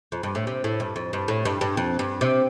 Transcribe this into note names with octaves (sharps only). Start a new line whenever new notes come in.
F2
G2
A2
C3
A2
G2
F2
G2
A2
G2
G2
F2
G2
C3